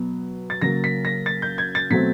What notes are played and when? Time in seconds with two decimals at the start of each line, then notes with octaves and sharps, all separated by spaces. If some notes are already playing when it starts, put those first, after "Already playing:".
Already playing: B2 F#3 B3
0.50 A6
0.62 C#3 F#3 A#3 A#6
0.84 B6
1.05 A#6
1.26 A6
1.42 G6
1.58 G#6
1.75 A6
1.90 B2 F#3 A3 C4 B6